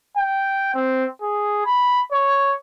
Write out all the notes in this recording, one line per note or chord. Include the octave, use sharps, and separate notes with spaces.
G5
C4
G#4
B5
C#5